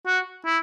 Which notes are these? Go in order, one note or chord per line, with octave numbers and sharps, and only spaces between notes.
F#4
E4